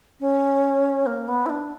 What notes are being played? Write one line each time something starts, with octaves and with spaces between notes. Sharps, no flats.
C#4
A#3
B3
E4
D4